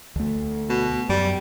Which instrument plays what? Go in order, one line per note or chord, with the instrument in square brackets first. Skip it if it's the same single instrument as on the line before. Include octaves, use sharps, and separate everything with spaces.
[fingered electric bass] D2 A3
[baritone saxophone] B2
[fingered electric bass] F#2 [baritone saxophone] G3